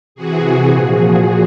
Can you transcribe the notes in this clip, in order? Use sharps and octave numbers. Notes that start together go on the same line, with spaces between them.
C3 E3 F#4 G#4
A#2 F3 F#4 G#4